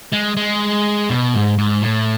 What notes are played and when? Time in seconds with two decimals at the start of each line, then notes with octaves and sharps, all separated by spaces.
0.13 G#3
0.37 G#3
1.10 B2
1.34 G#2
1.58 G#2
1.82 A2